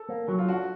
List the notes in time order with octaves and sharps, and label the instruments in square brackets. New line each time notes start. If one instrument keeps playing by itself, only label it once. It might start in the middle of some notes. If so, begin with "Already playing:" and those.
Already playing: [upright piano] A4
[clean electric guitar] A#3
F#3
[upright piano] F4
[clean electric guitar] D4 [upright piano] F#4